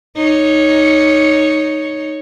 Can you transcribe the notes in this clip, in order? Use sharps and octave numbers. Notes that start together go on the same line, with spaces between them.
D#4 C#5